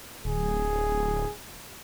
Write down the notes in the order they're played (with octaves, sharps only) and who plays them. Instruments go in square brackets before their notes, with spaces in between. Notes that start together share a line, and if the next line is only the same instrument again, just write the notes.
[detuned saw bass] D1 [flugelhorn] G#4